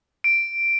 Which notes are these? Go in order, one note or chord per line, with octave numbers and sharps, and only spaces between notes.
D7